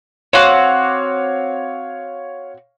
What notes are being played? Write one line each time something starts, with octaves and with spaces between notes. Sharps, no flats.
C4 F#4 C#5 F5 C#6 D6